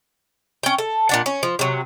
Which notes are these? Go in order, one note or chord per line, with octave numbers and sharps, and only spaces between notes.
C#4 G5
A4
A#2 D4 F#5
C#4
F3
C3 F#3